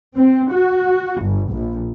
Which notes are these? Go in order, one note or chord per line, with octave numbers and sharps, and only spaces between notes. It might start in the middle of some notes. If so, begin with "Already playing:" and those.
C4
F#4
G1
A#1